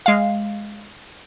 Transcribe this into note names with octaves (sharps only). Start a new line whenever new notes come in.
G#3 F5